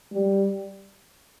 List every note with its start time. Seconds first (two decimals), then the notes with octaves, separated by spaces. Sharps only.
0.12 G3